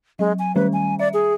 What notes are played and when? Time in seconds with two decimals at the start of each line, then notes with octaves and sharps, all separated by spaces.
0.19 F#3 G#3
0.39 G#5
0.56 D#3 G3 C#4 B4
0.73 G#5
0.99 D5 E5
1.14 G#4